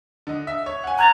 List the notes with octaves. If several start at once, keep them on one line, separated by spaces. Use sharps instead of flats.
D3 D#5
E5
C#5
F#5 G#5
A#5 F#6 G#6 A6